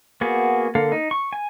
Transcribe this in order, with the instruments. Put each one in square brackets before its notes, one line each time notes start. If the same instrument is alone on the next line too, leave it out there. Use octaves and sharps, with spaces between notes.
[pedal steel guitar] A#3 B3 F#4 G#4
D3 A#3 A4 F5
D#4
C#6
G#5